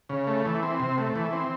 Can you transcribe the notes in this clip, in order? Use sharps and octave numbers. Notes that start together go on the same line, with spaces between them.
C#3
A3
E3
C4
C3
A3
E3
C4